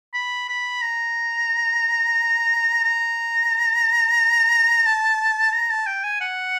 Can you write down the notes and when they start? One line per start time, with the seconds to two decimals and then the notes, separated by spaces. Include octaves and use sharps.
0.14 B5
0.49 B5
0.82 A#5
2.84 A#5
4.86 A5
5.53 A#5
5.70 A5
5.87 G5
6.04 G#5
6.21 F#5